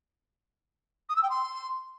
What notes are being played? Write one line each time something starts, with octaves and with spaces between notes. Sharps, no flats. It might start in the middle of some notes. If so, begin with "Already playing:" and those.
D#6
E6
G5
C6